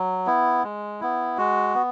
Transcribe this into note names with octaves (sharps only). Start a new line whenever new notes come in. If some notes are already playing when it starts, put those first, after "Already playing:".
Already playing: F#3
B3 E4
G#3
B3 E4
G#3 F#4
B3